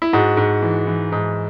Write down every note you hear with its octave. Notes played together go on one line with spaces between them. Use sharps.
E4
G#2 F#4
G#2
E3
E3
G#2